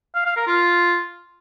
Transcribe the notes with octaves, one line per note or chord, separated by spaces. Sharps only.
F5
F5
A#4
F4